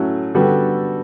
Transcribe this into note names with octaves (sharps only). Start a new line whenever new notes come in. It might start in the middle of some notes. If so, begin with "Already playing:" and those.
Already playing: A2 F#3 A3 C#4 F#4
D3 G3 B3 F#4 A4